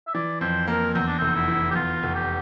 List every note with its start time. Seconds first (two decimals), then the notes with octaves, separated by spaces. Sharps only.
0.07 E5
0.14 E3 D5
0.41 F2 C5
0.67 A#3 A#4
0.94 E2 C4
1.07 D4
1.19 F1 C4
1.35 E4
1.48 E3
1.70 G4
1.75 E2 F4
2.03 F1
2.15 G4